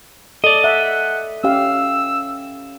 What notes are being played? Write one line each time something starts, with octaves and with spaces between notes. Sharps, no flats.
A4 D5 D#5
E5 F#5
C#4 G4 F5 E6